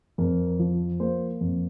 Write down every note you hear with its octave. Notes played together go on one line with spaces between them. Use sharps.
F2 A#4
F3
A#3 C5
F2